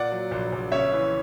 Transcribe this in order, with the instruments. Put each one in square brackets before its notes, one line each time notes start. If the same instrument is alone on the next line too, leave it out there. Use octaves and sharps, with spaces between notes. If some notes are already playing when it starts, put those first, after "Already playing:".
Already playing: [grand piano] A#2 D5 F#5
F#3
A#1
A#1
C#3 C#5 E5
E3